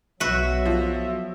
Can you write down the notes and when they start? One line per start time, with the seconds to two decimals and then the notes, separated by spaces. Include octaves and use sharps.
0.20 B1 F#3 F#4 B4 E5
0.66 F3